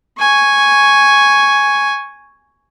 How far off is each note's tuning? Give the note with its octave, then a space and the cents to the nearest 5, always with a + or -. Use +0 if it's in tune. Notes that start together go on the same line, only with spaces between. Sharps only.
G#5 +0 C#6 +0